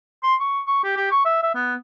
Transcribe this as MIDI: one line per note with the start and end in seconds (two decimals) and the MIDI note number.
0.23 0.35 84
0.40 0.61 85
0.67 0.81 85
0.84 0.96 67
0.97 1.09 67
1.12 1.21 85
1.25 1.42 76
1.43 1.52 76
1.55 1.75 59